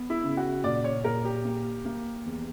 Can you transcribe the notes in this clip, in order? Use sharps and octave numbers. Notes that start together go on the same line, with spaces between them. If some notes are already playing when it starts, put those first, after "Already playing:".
Already playing: B3
E4
C#3
F#4
A#2 D5
C#5
A#2 A#4
G4
A#3
A#3
E2